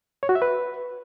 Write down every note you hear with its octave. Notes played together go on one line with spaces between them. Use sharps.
C#5
F#4
E5
B4